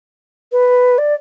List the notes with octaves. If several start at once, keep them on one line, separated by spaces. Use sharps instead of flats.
B4
D5